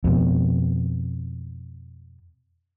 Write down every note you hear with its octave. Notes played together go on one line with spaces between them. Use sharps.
F2 B2